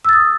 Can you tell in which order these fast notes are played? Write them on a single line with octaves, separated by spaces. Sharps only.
E6 A6 D#6